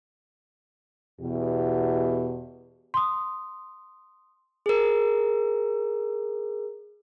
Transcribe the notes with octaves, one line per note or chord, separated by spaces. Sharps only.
E2 B2 G4
C6 D#6
G#4 A#4